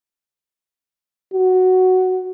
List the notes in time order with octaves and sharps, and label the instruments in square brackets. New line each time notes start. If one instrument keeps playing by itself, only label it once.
[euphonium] F#4